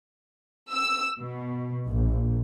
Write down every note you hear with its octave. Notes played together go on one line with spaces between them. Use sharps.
E6
B2
A#1